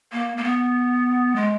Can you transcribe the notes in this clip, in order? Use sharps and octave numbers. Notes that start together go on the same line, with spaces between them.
A#3
A#3
B3
G#3